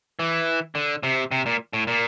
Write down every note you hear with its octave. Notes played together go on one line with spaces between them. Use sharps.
E3
D3
C3
C3
A#2
A2
A#2